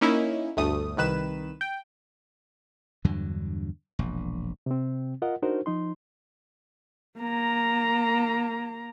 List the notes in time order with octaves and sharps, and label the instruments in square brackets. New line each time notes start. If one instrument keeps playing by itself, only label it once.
[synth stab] A#3 C#4 D#4 E4
G1 D2 A3 D#6
C2 D#3 B4 E7
G5
[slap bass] E2 G2 D3 F#3
E1 A#1
[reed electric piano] C3 C4
F4 A#4 D#5 F#5
D4 D#4 F#4 A#4 C5
F3 D#4 C6
[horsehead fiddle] A#3 A#5